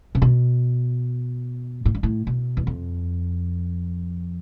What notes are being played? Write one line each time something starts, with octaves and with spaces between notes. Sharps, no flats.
C3
B2
A2
G2
A2
B2
E2
F2